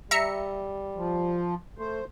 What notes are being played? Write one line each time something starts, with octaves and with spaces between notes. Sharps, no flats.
G3 E5 A#5 C#7
F3
A3 C5